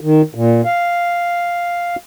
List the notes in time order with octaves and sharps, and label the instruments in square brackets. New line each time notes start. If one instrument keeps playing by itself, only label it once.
[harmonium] D#3
A#2
F5